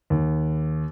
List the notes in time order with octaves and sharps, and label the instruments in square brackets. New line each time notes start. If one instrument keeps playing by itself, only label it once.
[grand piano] D#2